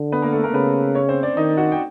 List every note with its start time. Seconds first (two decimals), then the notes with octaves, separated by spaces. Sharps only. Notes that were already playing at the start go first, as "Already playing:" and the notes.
Already playing: D3
0.12 B3 B4
0.22 A#3 A#4
0.33 A3 A4
0.43 A#3 A#4
0.53 C#3 B3 B4
0.95 C#4 C#5
1.09 C4 C5
1.23 D4 D5
1.37 D#3 D#4 D#5
1.57 F#4 F#5
1.72 G5